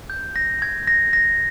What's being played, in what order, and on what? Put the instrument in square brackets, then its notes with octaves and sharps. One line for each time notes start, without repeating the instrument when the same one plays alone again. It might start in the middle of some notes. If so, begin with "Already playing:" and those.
[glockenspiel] G6
A#6
G#6
A#6
A#6